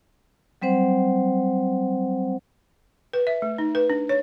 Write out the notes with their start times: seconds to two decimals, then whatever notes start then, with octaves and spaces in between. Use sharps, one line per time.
0.62 F#3 G3 C4 C5 F#5
3.13 B4
3.27 E5
3.42 A3
3.58 D#4
3.75 B4
3.90 D4
4.09 C#5